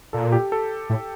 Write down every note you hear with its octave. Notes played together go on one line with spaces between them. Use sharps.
A#2 A4
G4
A4
A2